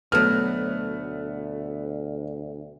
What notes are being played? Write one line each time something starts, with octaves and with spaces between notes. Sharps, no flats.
D2 B2 F#3 A3 B3 F6